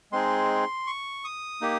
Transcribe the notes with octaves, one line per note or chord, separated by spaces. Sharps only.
G#3 C4 D#4 G#4 C6
C#6
D#6
A#3 D#4 G4